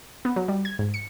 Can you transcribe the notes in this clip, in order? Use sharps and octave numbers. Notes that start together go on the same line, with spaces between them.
B3
F#3
G3
G#6
G#2
C#7